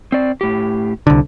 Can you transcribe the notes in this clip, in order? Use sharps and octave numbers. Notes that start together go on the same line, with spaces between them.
C4 D5
A2 G4
C2 D3